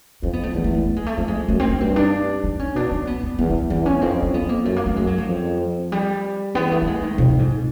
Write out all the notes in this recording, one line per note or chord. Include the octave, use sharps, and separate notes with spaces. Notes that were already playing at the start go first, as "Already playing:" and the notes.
F2 C#4
B3
A3
E2 A3
A3
A3
A3
G#3
A3
F2 A3
G#3
F#2 A3
C4
C#4
G2 C4
D4
D4
C#4
B2 D4
C#4
B3
B3
E2 B3
B3
E2 C4
C#4
F2 C4
C#4
F2 B3
A#3
F#2 A3
A#3
A3
F#2 G#3
F#3
F3
F2
G3
E2 B3
A3
A3
G#3
D#3
F2 B2
A2
G#2